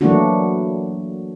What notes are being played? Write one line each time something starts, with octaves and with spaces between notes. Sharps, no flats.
E3 F#3 A3 A#3 D4 F#4